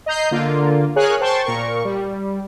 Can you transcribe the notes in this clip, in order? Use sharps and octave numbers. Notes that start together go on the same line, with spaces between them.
D#5 A#5 G6 C7
D3 A#3 F4
G#4 A#4 C#5 F5 G#5 F#6
C5 G5 A5 C6 C#6
A#2 A#4 C#6
G3